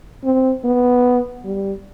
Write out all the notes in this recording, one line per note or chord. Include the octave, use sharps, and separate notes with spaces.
C4
B3
G3